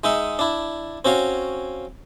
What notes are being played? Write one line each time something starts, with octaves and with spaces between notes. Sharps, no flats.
G#3 D#4 E5 F#5
D4 E4
C4 C#4 F#4 F5